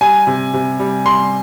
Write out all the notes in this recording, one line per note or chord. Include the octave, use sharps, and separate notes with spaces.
G3 G#5
C3
C3
G3
G3 C6